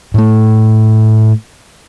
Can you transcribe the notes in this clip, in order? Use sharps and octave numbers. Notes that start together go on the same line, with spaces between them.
A2 A3